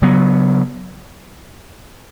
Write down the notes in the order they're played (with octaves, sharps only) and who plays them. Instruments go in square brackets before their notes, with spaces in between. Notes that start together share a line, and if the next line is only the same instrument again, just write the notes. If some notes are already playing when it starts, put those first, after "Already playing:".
[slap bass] C#3 F#3 B3